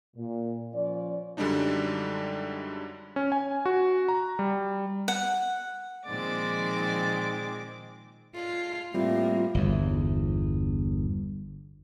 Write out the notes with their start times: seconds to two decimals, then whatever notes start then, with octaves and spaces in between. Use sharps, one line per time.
0.16 A#2
0.74 F3 C#4 F4 C5 D5
1.37 F#2 D3 G3 G#3 D4 D#4
3.16 C#4
3.32 G#5
3.66 F#4
4.08 A#5
4.39 G3
5.08 F#5
6.06 A#2 D#3 F3 G#3 C4 D5 D6
8.34 G#3 D4 F4 A4
8.94 A2 G3 A3 A#3 C4 E4 F4 G4
9.54 G1 E2